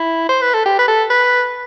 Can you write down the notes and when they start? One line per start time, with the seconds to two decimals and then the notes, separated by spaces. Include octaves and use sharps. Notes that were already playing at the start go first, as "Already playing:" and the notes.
Already playing: E4
0.29 C5
0.41 B4
0.54 A4
0.65 G4
0.79 B4
0.88 A4
1.10 B4